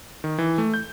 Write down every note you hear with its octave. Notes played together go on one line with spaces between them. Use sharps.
D#3
E3
A3
G6